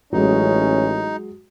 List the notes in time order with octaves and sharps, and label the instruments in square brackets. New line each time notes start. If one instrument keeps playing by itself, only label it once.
[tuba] A1 [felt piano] F#3 G#3 [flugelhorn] C#4 [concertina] D#4